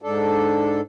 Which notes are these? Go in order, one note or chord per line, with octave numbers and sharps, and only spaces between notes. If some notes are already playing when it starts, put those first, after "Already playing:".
G#2 D4 A4